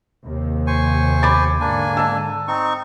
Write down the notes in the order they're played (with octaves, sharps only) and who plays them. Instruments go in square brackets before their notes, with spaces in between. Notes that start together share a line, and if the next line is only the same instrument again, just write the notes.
[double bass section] D#2 C3
[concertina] C5 G#5 C#6
[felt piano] B5 D6 A6
[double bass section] G#2 D3 [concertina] A#3 D4 G#5
[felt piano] A5 E6
[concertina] C4 D#4 C#6